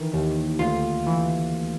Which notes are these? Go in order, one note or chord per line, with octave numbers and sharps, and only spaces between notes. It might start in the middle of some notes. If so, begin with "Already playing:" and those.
Already playing: D#3 E3
D#2
D2 F4
E3